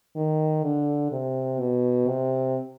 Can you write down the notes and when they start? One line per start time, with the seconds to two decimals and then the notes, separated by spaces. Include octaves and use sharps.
0.16 D#3
0.64 D3
1.12 C3
1.60 B2
2.07 C3